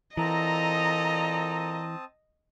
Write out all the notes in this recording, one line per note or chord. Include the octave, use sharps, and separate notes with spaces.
A#2 E3 C4 A4 D#5 A5 A#5 D#6